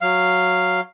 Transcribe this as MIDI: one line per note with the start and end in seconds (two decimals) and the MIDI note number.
0.01 0.80 54
0.01 0.80 77